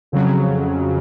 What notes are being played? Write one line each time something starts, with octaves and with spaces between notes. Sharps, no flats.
F2 C#3 F#3